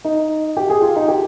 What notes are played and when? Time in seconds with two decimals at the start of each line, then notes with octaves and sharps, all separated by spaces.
0.05 D#4
0.57 G4
0.70 G#4
0.82 F4
0.96 D#4
1.08 G4